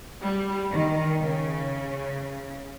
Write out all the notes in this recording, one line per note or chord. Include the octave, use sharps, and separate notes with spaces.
G3
D#3
C#3